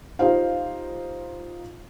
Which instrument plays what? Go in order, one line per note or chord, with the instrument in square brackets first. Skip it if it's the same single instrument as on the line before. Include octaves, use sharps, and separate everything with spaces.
[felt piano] D#4 F4 G4 C5 F5